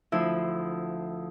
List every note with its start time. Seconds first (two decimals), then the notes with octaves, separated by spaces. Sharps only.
0.12 D2 F3 E4 C5